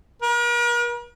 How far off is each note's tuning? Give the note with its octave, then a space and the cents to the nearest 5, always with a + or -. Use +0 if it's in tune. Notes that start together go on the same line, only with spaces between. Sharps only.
A#4 +45